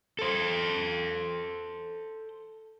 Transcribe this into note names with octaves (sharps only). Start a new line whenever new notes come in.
A4 C5